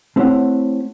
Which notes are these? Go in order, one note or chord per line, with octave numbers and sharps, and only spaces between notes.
A3 C4 E4 G4 C#5 F#5